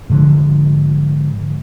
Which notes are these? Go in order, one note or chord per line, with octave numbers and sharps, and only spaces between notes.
G#2 D3 F3